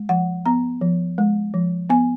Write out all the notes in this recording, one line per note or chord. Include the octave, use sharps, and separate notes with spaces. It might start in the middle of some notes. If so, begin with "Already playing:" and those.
Already playing: G#3
F3 F#5
B3 A#5
F3
G#3
F3
B3 G#5